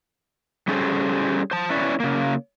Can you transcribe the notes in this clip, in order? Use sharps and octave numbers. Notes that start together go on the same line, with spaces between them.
G3 C#4 G#4 A4 C5
C5 A5
C#4 E4 B4 C#5 D5
C#3 A#3